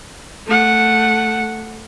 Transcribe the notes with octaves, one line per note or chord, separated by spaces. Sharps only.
A3 F#5